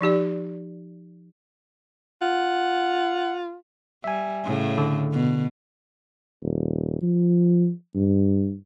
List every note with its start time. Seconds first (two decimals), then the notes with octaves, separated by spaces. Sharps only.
0.01 F3 D#4 G4 D5
2.22 F4 F#5
4.04 G3 E5 G#5
4.44 A2 C#3
4.78 D3
5.12 B2
6.42 D#1
7.02 F3
7.96 G2